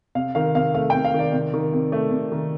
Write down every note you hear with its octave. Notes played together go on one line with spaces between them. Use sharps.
C3 F5
D#3 F5
C3 F5
A3 F5
C3 G5
F5
D#3 D5
C3
D#3
C3
A3
C3
D#3